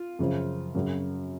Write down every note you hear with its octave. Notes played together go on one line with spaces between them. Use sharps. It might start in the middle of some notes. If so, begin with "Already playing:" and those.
Already playing: F4
F#2 C#3 F3
F#2 C#3 F#3